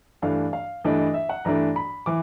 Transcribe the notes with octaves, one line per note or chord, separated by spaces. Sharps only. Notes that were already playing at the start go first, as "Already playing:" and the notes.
G2 E3 A3 D4 F5
F5
G2 E3 A3 D4 D#5
D#5
E5
F#5
G2 E3 A3 D4 A#5
B5
E3 D6